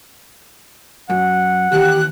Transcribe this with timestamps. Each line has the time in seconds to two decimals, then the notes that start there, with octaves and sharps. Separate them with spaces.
1.10 F#2 F#5
1.72 D#2 E3 G4 F#6